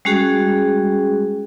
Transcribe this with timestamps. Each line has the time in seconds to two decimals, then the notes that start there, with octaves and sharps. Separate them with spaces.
0.05 G3 G#3 C#4 F#4 G#4